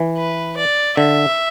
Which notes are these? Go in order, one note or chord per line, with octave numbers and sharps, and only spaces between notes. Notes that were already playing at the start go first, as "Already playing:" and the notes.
Already playing: E3
B4
D5
D3 E5